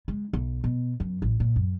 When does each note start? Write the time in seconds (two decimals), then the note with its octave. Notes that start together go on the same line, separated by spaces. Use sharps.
0.08 G#3
0.33 B1
0.64 B2
1.00 F#2
1.22 A1
1.40 A#2
1.56 F#2